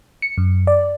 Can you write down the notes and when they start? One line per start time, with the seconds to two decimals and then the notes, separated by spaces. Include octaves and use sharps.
0.22 C#7
0.38 F#2
0.67 D5